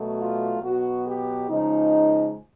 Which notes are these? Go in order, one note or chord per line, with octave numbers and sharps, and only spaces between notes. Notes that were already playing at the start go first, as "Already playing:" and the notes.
Already playing: B2 F#3 A3
F4
B2 F#3 B3 F#4
G4
C#3 F3 G#3 D#4